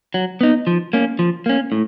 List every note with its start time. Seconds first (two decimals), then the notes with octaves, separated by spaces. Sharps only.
0.14 F#3
0.41 B3 D#4
0.67 F3
0.93 A#3 C#4
1.19 F3
1.46 A#3 C#4
1.72 A2